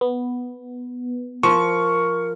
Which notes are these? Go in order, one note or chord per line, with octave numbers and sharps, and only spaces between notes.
B3
F3 A#4 C#6